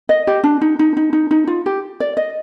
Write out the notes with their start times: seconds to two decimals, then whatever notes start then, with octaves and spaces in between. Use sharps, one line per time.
0.09 D#5
0.27 G4
0.44 D4
0.61 D#4
0.79 D#4
0.97 D#4
1.13 D#4
1.31 D#4
1.47 F4
1.66 G4
2.00 D5
2.17 D#5